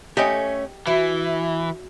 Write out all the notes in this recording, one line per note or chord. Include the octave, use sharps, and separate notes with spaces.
A3 C#4 G4 D#5 G5 D#6
E3 E4 F#4 E5